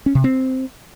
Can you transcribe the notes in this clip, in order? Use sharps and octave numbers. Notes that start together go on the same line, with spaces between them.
C#4
C3
C4